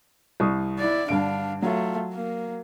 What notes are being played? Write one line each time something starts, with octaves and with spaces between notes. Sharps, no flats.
C2 C#6 D#6
E4 D5
G2 D3 D4 F5 D7
F#3 A3 F4
A#3